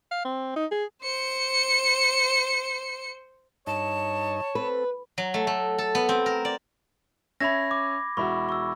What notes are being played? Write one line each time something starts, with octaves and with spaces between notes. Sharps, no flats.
F5
C4
D#4
G#4
C5 C#7
G2 D#4 C#5 D#5 A5
C4 A4 B4
F#3
A3
A3
A4
B3
C4
A#4
D5
C#4 E5 B5 G#6 A#6
D6
E1 E4 F#4 B5 C#6
C#6 E6